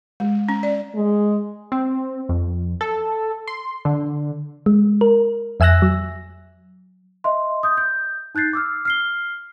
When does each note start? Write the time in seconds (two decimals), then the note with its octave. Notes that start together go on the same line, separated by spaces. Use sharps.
0.20 G#3
0.49 C#4
0.63 D5
0.95 G#3
1.72 C4
2.29 F2
2.81 A4
3.48 C6
3.85 D3
4.66 G#3
5.01 A#4
5.60 F2 E5 G#5 E6 F#6 A#6
5.82 F#3
7.24 D#5 E5 C6
7.63 D#6 G6
7.77 G6
8.35 D#4 F#6 G6 A6 C7
8.53 D6 E6 F6
8.85 F6 C7 G7